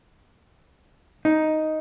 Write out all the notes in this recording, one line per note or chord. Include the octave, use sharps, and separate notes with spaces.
D#4